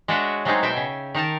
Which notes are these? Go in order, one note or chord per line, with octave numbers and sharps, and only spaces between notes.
G#3 D4 F#4 C#5 D#5 E5
F#3 G#3 A3 C4 D#4 G#4
B2 E5 G5 G#5
C#3
D#3 D#4 A#4 A5